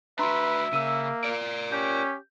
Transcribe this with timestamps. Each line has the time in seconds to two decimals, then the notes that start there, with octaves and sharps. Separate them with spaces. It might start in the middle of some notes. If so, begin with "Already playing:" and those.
0.19 D4 F#4 B4 E5 A#5 C6
0.73 C#3 A#3 E6 D#7
1.24 A#4 D5
1.72 C#4 G4 G6